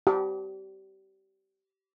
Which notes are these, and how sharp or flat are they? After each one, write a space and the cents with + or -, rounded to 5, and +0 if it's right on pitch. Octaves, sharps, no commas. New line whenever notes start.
G4 -30